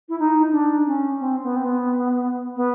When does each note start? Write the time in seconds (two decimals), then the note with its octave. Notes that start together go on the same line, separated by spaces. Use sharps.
0.09 E4
0.19 D#4
0.52 D4
0.86 C#4
1.20 C4
1.43 B3
1.56 C4
1.64 B3
2.56 B3